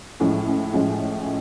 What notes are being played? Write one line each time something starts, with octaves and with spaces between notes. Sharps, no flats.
A2 F3 G#3 C#4
C#4
A2 F3 G#3 C#4